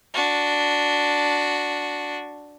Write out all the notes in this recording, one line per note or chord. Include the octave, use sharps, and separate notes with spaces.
D4 F#4